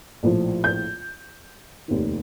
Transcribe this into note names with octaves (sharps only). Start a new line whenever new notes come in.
A#1 A2 F3
G6
F1 D#2 D#3